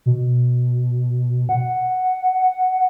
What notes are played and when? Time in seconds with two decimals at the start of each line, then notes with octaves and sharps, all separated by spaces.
0.06 B2
1.49 F#5